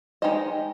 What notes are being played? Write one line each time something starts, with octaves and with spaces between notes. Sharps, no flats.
G#3 D#4 G4 C5 D#5